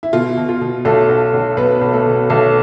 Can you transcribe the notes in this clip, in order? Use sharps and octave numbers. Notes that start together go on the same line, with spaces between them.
E4
B2 F4
B2
F4
B2
B1 A3 A4
B1
B1
B1 B3 B4
B1
A3 A4
B2
B1 A3 A4